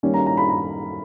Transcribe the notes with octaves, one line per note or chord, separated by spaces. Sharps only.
D#3 G3 A#3 C#4
A#5
A#5
B5
A#5